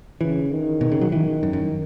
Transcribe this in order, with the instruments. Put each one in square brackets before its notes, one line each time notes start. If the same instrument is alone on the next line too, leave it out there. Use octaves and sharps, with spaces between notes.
[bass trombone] C#3 [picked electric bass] E3
[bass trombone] D#3
[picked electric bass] B2
C#3
F#3
[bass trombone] D#3 [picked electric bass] E3
[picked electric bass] F#2
F#2